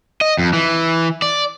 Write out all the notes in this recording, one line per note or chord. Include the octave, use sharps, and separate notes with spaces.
D#5
F2
E3
D5